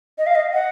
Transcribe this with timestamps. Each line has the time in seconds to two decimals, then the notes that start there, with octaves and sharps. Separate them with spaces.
0.18 D#5
0.26 F5
0.35 D#5
0.53 F#5